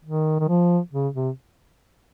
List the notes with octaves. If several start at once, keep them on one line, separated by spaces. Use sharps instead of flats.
D#3
D#3
F3
C#3
C3